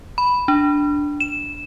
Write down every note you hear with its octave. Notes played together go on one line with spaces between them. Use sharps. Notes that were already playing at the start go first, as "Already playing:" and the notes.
B5
D4
E7